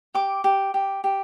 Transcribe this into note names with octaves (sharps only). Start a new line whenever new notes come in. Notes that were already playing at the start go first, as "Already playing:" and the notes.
G4 D6
G4
G4
G4